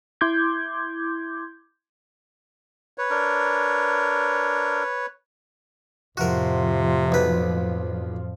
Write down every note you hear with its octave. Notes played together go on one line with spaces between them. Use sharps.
E4 C6 D6 G6 G#6
B4 C#5
D4 A#4
F2 A2 C3 F3 F#4 A#4
B1 B4